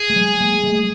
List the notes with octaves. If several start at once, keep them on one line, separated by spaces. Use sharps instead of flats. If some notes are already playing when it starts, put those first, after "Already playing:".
Already playing: G#4
A3
F#3 G#3
G#3 A#3
G3 A3